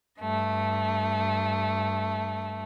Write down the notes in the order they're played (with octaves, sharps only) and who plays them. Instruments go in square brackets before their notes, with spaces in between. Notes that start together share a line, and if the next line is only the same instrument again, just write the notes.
[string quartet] G2 A3